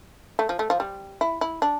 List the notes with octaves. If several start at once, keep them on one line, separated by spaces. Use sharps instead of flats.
A3
F3
A3
F3
G3
E4
E4
D4